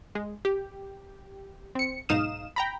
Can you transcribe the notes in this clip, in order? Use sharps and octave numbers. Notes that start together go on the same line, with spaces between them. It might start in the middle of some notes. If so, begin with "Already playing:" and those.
G#3
G4
C4 C#7
B1 G#2 D#4 F5 D#6 E7
G5 A#5 B5